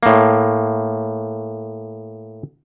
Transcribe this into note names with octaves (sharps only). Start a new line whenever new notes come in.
A2 A#3